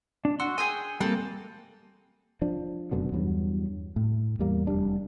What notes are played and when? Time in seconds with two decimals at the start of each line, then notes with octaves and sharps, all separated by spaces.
0.25 D4
0.40 F#4 C6 E6
0.58 G#4 G5 G#5
1.00 G3 A#3 C4 A4
2.42 F3 D4
2.91 F1 F#2 B2 D3
3.12 E2 G2 F#3
3.96 A2
4.39 E2 G3 A#3
4.67 F1 F2 G3 D4